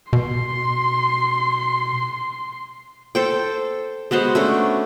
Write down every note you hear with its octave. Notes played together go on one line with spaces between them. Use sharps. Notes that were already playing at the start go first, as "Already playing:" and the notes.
B2 C6
A4 C5 G5
G#3 B3 F#4 C5
A3 C#4 D4